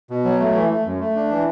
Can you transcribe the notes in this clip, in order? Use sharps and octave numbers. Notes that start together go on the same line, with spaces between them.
B2
F#3
A3
E3
A3
F#2
A3
D4
E3